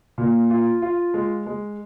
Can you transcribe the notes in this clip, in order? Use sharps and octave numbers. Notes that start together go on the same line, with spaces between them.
A#2
F4
F4
G#3
G#3